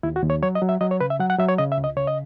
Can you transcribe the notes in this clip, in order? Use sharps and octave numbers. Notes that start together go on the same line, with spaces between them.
D#2 E4
F#4
D#2
C#5
F#3 C#5
D#5
F#3
E5
F#3 D#5
C#5
C#3 B4
E5
F#3 F#5
F#5
F#3 E5
C#5
C#3 D#5
E5
C#2
D#5
C#3 C#5
D#5